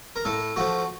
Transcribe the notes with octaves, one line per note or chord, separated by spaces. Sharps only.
A#4
A2 A4
F3 A3 F#4